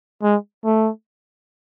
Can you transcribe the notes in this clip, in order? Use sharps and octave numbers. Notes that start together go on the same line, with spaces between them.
G#3
A3